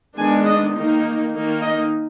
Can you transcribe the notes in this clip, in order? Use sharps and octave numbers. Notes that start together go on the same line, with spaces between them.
D#3 G#3 B3 D4 G#5
D#5
D#3 A#3 D#4
D#3 A#3 D#4
D#5